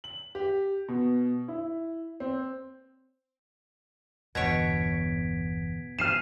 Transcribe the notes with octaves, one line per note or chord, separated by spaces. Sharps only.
F#7
G4
B2
E4
C4
G1 E2 B2 D3 C#5 G#6 B6 D7
F3 F6 C7 D#7 E7